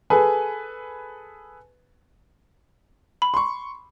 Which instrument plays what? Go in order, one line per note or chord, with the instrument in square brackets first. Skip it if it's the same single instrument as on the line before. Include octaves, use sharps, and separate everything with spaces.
[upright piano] G#4 A4 B4 G#5
[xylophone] B5
[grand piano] C6 C#6